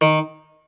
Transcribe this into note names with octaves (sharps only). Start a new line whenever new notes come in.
D#3